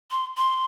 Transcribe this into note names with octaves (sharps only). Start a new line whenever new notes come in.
C6
C6